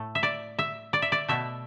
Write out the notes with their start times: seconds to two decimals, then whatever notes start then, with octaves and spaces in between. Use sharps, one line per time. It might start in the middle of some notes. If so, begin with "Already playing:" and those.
Already playing: A2 A3
0.15 E5
0.23 D5
0.59 E5
0.93 D5
1.02 E5
1.12 D5
1.28 B2 A3 E5